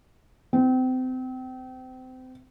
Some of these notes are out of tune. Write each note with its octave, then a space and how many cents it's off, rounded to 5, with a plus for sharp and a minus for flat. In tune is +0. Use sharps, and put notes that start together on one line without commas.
C4 -30